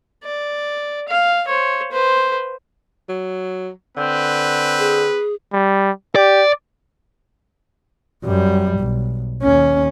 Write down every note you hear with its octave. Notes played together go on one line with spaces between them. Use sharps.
D5
F5
C5 C#5
B4 C5
F#3
D3 C4 B4
G#4
G3
G4 D5
F#2 G3
B1
D#2 C#4